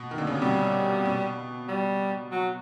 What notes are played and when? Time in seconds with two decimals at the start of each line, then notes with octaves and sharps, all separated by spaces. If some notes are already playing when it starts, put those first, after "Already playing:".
Already playing: B2
0.11 D#3
0.18 D3
0.27 C#3
0.35 C3
0.42 B2 G3
1.06 B2
1.69 G3
2.32 F#3